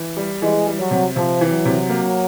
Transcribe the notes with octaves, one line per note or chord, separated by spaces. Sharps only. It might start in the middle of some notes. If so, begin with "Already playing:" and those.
Already playing: E3
G3
E3 G#3
G3
F#3
C3
C3 F3
E3
F#3
C3
A#3